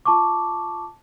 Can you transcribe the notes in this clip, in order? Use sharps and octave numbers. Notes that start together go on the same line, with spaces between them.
F4 A5 C#6 D6